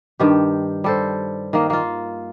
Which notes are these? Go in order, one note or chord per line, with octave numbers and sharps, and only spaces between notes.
G2 D#3 G4
G3 A4 C5
D#3 A#3 D#5
A#3 F4